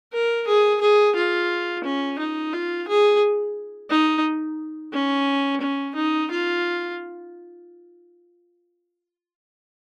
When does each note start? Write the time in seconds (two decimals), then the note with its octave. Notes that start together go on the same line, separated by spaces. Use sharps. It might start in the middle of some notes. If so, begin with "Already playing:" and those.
0.13 A#4
0.48 G#4
0.81 G#4
1.15 F4
1.84 C#4
2.19 D#4
2.53 F4
2.87 G#4
3.90 D#4
4.93 C#4
5.61 C#4
5.96 D#4
6.30 F4